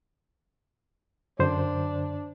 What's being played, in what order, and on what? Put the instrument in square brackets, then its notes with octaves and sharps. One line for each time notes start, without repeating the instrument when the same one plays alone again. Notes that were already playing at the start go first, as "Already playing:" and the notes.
[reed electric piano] F#2 D3 C5 [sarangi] D4